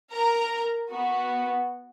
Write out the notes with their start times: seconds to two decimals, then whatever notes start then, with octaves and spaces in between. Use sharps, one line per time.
0.13 A#4 A#5
0.92 B3 F#4